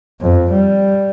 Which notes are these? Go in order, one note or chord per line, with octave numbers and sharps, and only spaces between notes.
F2
G3